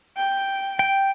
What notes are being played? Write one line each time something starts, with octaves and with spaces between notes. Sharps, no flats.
G5
G5